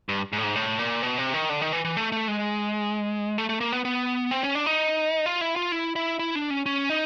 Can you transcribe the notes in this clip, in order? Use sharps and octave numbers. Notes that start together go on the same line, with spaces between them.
G2
G#2
A2
G#2
A2
A#2
B2
C3
D#3
D3
D#3
E3
E3
A3
A3
G#3
A3
A3
A#3
B3
B3
C4
C#4
D4
D#4
F4
E4
F4
E4
E4
E4
D4
C#4
C#4
D#4